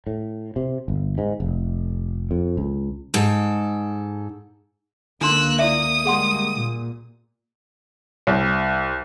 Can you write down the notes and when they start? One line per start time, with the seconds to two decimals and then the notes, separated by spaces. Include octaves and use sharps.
0.07 A2
0.56 C3
0.88 G1
1.18 G#2
1.40 F1
2.31 F2
2.57 C#2
3.14 G#2 A4
5.21 C#2 D3 A#3 D4 D#4 C6 E6 F#6
5.59 E4 D5 E5 D#6
6.05 G3 G#3 A#3 G#4 F#5 C6
6.52 A#2
8.27 C2